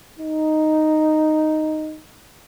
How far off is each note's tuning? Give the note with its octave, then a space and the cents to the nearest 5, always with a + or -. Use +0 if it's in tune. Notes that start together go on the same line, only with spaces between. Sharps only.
D#4 -5